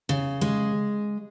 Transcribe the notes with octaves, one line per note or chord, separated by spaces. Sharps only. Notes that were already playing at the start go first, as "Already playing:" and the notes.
C#3
G#3